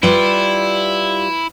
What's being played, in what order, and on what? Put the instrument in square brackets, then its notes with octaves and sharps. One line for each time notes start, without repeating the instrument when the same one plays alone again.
[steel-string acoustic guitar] G3 F4 [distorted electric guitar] E4 [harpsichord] B4